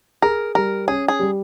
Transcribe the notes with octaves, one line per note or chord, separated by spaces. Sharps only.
G#4 A#4
G3 A#4
C#4 G#4
G#4
G3